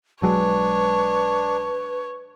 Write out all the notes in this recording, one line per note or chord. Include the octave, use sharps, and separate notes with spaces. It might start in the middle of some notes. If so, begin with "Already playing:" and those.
B1 F#3 G#3 D4 B4 C#5